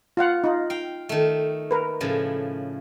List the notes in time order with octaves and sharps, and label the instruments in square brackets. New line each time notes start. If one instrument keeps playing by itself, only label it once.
[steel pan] F4 F5 F#5
D#4 F4
[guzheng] F5 G5
D#3 A3
[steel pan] A#4 B4
[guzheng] A2 C#3 F3